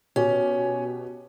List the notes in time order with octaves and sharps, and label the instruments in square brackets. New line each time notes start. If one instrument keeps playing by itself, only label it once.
[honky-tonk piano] B2 G4 [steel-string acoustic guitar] C#4